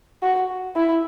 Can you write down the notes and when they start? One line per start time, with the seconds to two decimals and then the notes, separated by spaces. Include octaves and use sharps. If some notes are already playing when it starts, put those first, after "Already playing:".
0.22 F#4
0.76 E4